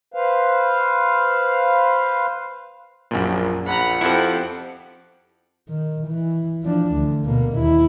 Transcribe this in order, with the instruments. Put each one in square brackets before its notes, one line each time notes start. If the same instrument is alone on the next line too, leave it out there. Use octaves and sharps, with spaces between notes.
[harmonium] B4 C5 F5
[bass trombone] A#1 [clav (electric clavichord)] F#2 A#2
[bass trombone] A#1 [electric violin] F#5 [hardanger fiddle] A#5 B5
[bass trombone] F2 [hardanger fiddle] C4 G4 [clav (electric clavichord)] E4 A4
[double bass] D#3
E3
F3 D4
D2
B2 A#3
D#2 E4